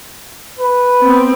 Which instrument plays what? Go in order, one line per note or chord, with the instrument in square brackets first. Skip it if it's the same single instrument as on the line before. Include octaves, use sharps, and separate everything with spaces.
[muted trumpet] B4
[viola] B3 C4